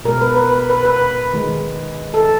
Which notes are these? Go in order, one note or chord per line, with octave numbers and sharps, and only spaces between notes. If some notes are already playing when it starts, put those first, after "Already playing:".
B2 G#3 A#4
B4
B4
B4
B4
B4
D#3 G#3
A4